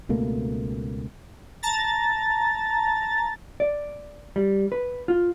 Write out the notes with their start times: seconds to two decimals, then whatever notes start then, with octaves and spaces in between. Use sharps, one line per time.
0.09 C#2 B2 A3 A#3
1.63 A5 A#5 A6
3.60 D5
4.36 G3
4.72 B4
5.08 F4